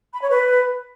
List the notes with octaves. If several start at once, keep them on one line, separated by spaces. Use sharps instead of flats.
B5
C#5
B4